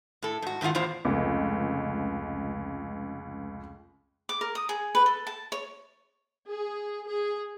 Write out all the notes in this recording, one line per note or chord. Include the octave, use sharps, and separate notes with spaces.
A2 A4
G#2 F#4
G#2 D#3 E4 F4 F#5
E2 A2 F4 C5
F1 C#2
D6
A#4
D#6
G#4
B4
A4
A5
C#5
G#4
G#4